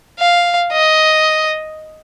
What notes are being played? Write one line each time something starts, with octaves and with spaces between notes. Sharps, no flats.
F5
D#5